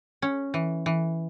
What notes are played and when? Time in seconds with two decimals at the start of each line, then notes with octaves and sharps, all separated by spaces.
0.22 C#4
0.54 E3
0.86 E3